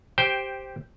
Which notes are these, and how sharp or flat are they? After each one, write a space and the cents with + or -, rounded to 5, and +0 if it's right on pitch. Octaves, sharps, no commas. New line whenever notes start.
G4 -5 C5 +0 G5 +10